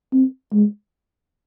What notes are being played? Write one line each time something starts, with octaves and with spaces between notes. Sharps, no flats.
C4
G#3